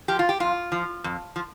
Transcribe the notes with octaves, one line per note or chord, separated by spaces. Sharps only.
F3 G4
F4
G4
F2 F4
F3
F2
F3